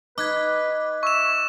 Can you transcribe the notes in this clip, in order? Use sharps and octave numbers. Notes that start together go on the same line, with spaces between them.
D#4 B4 D6 F#6 G#6
E5 C#6 E7